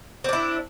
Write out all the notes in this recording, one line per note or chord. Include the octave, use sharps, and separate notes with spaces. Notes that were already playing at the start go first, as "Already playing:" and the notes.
C4 D4 E4